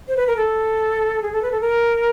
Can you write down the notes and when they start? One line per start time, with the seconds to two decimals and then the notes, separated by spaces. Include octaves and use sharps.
0.08 C5
0.17 B4
0.27 A#4
0.36 A4
1.22 G#4
1.32 A4
1.42 B4
1.52 A4
1.61 A#4